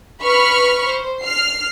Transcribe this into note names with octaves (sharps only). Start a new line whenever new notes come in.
B4 B5 C#6 F6
C5
F6 C7